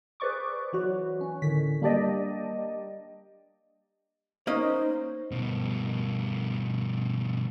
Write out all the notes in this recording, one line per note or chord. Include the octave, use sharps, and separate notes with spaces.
G#4 B4 C5 D5 C#6 D6
E3 F#3 F#4 B4
C#4
A2 D3 D#3 B6
G3 A#3 D4 G4 D5 D#5
A#3 C#4 D#4 C5 D#5
G2 B2